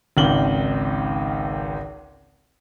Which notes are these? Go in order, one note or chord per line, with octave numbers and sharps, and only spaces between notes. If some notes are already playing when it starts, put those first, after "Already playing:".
G#1 C#2 D#3 F#7 G7